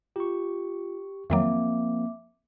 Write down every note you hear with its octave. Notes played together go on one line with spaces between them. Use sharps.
F4 G4 C#6
F2 D#3 F3 F#3 A#3 C4 E5 D6